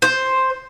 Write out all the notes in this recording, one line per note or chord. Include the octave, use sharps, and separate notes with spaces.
C5